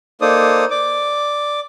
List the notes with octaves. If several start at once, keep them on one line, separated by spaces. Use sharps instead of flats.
A#3 D#4 A4 C5 D5 D#6
D5 D6